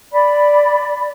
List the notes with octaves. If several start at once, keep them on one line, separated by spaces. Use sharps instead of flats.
D5 B5